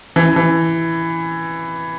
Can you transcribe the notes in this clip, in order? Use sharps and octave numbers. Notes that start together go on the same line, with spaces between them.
E3
E3